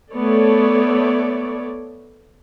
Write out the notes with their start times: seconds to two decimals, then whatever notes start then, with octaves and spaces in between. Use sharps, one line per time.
0.12 A3 B3 A4 C#5 D5